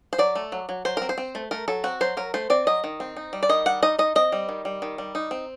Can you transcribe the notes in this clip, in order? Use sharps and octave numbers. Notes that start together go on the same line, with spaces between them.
C5
F#3 D5
A3
F#3
F#3
F#3 C5
C4 A#4
C5
C4
A3
A3 A#4
F#3 A4
C4 F#4
F#3 C5
F#3 A#4
A3 C5
C4 D5
F#3 D#5
D#3
C4
D#4
G3
D5
D#3 D#5
G3 F#5
D#4 D#5
D#4 D#5
C4 D#5
G3
D#3
G3
D#3
G3
D#4
C4